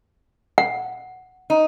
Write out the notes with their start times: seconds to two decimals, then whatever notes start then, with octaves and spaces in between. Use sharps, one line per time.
0.58 F#5
1.50 D#4